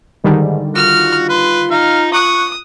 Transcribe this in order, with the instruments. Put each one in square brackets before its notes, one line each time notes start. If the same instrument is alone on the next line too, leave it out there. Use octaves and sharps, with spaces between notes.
[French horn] G#2 [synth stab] D3 D#3 G3
[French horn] F4 [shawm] F#4 [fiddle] F6
[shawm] B4 [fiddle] C6
[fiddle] D#4 [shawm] F5
[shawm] C#6 [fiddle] D#6 [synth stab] F#6